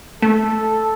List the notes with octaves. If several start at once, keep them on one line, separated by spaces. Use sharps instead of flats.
A3 A4